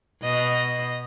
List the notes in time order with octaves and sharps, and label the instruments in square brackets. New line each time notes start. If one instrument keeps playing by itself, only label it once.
[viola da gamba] B2 D#5